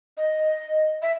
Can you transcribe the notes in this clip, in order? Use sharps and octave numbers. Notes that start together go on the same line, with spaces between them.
D#5
E5